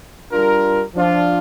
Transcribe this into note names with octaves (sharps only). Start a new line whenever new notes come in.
G3 D4 F4 A#4
F3 D4 F4